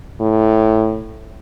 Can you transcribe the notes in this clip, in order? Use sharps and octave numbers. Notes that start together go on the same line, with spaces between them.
A2